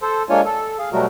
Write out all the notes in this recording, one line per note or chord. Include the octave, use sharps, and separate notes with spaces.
A4 C5
G#3 A#3 D4 F4 C#5 G#5
A4
G#4 F5
B2 F#3 G3 A3 F#4 A#4